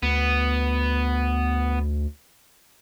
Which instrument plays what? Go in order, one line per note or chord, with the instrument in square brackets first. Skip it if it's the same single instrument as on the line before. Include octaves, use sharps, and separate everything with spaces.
[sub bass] D2 [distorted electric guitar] B3